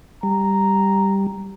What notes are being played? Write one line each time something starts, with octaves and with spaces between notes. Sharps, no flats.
G3 A#5